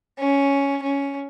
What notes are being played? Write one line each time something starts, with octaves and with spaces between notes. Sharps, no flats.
C#4
C#4